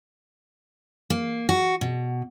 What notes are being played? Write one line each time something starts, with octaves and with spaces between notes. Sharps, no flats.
A#3
F#4
B2